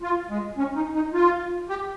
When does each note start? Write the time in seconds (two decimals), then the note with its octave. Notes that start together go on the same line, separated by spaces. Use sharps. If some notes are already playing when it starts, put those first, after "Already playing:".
0.02 F4
0.30 G#3
0.58 C#4
0.76 D#4
0.95 D#4
1.13 F4
1.69 G4